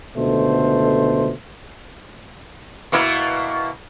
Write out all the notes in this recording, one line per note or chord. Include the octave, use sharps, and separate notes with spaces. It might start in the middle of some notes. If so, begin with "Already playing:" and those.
C#2 B2 D3 A3 B3 C5
B2 A#3 E4